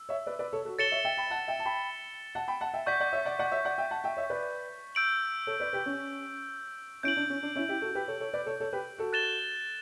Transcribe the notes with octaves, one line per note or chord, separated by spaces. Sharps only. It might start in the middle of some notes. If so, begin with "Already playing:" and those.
Already playing: E6
C#5 E5
B4 D5
B4 D5
A4 C#5
F#4 A4
A4 C#5 A6 C#7 E7 G7
C#5 E5
E5 G5
G5 B5
F#5 A5
E5 G5
A5
G5 B5
F#5 A5
G5 B5
F#5 A5
E5 G5
D5 F#5 C#6 G6 B6
D5 F#5
C#5 E5
D5 F#5
D5 F#5
C#5 E5
D5 F#5
E5 G5
F#5 A5
E5 G5
C#5 E5
B4 D5
E6 G6 D7 F#7
A4 C#5
B4 D5
G4 B4
C#4
C#4 E4 G6 D7 F#7
D4
C#4
D4
C#4 E4
E4 G4
F#4 A4
G4 B4
A4 C#5
A4 C#5
B4 D5
A4 C#5
A4 C#5
G4 B4
F#4 A4
F#6 A6 E7 G7